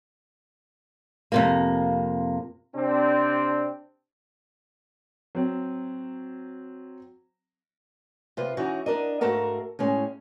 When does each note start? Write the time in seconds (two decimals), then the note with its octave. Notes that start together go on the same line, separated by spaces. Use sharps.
1.32 F2 C3 A#3
2.76 C3 C4 D4
5.35 F#3 C4
8.37 C3 F4 B4
8.57 E3 C#4 D#4 E4 F#4
8.86 D4 A#4 D#5
9.21 G#2 A3 F#4 A4 A#4 F5
9.79 A2 G#3 C#4